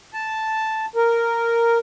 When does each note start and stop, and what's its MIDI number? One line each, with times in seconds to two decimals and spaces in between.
0.14 0.85 81
0.96 1.78 70